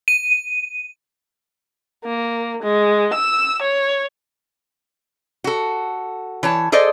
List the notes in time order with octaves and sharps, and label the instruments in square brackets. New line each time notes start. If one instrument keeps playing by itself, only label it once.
[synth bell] D#7
[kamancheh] A#3
G#3
E6
C#5
[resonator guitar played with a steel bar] F#4 A4
E3 C#5 A5
G#4 A4 C5 D5 D#5